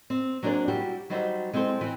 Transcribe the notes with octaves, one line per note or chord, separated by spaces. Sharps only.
C4
F#3 A#3 D4 G#4 C5 D5
G3 E4 F#4 G4
F#3 G3 D#4 F#4 C5 E5
G#3 C4 E4 A4 C5
E3 C4